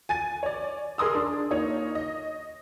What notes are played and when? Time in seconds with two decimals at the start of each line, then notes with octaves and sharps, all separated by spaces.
0.09 G#5 A6 D#7
0.43 C#5 D5
0.98 G#4 A#4 C6 D#6 E6
1.15 D4
1.51 A#3 D#4 C#5
1.95 D#5